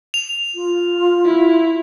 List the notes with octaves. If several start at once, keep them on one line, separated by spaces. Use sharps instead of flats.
F7
F4
E4